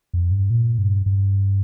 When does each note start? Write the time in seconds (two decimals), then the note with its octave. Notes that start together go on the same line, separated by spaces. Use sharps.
0.14 F2
0.31 G2
0.50 A#2
0.78 G2
1.06 G2